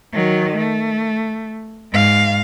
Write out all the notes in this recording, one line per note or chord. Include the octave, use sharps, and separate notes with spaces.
D#3 F#3
A3
G#2 F5